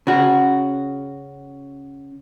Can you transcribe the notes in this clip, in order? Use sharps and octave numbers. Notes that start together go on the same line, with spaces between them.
C#3 F#4